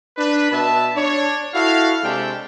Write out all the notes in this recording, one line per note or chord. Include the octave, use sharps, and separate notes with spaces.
D4 B4
B2 B4 E5 A5
D4 C#5
E4 F#4 A4 F5
C3 G#3 D4 G4 A4 G5